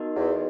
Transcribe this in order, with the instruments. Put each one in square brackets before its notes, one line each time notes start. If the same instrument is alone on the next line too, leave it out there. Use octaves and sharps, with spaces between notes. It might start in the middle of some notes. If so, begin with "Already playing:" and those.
Already playing: [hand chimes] B3 D#4 F#4 A#4 D#5
[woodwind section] E2